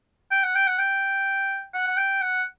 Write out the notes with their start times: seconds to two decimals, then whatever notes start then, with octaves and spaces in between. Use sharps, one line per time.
0.31 G5
0.43 F#5
0.55 G5
0.67 F#5
0.78 G5
1.74 F#5
1.88 F#5
1.97 G5
2.21 F#5